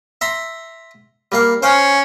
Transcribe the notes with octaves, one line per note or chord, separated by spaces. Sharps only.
E5 A#5 C6
G3 A#3 F5
C#4 C5 F5 G5